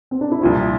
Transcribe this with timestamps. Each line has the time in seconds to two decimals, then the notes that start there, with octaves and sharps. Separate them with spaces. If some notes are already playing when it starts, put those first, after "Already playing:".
0.11 C4
0.21 D4
0.32 E4
0.41 C2 A#2 F3 F4